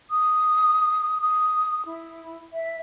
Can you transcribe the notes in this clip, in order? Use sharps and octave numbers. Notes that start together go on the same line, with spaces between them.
D#6
D#6
E4
E5